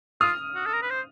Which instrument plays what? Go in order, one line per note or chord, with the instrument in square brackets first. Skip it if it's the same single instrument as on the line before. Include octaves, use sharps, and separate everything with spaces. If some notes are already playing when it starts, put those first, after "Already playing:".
[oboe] F4 [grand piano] D#6 F6
[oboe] F#4
A4
A#4
B4
C5